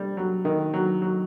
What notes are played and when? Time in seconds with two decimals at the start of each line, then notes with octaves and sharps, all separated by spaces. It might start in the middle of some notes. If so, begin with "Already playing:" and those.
Already playing: G3
0.17 F#3
0.45 D#3
0.74 F#3
1.02 F#3